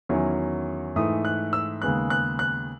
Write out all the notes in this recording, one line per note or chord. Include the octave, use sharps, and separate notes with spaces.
E2 D#3 F#3 C#4 E4
G#2 E3 A3 D#6
F#6
E6
D#2 C#3 G#3 B3 F#6
F#6
F#6